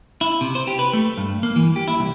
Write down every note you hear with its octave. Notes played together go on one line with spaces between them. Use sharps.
E4
C3
C5
G4
B4
A3
G2
A#3
E3
G4
E4
C2